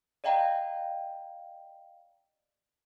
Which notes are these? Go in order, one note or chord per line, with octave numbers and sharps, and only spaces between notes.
D5 D#5 F5 G5 A#5